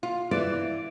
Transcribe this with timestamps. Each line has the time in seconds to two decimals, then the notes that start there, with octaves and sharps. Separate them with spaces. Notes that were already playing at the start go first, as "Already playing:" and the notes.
0.03 F4
0.31 E3 D5